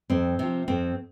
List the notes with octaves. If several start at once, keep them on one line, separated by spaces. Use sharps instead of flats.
F2 C4
C3 F3
F2 C4